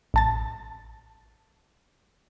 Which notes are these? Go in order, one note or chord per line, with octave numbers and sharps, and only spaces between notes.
A1 A5 A6